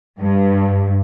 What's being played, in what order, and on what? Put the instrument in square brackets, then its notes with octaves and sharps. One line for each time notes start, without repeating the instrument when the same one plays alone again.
[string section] G2